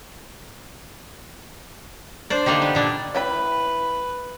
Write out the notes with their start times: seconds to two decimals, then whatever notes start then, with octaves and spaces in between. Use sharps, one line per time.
2.30 D4 C5 D5
2.46 D3 A#3 D4 D#4 G4
2.62 B3
2.75 A#2 D4
3.15 E4 B4 G5 B5